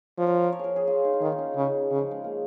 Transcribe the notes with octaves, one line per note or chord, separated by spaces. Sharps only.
F3 C#5
A#4
C#5
A#4
C#5
G#4 A#4
G#4
F4
D#4
F4
D#3 D#4
D#4
C#4
C#3
C#3
F3
G#3
A#3